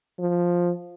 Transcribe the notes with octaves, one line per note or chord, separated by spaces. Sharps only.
F3